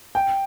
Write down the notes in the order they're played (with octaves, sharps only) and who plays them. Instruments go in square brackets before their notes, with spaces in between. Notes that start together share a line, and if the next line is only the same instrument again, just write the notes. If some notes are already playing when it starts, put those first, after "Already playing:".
[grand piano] G5